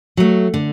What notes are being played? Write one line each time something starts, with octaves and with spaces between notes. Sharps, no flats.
F#3 A3
D3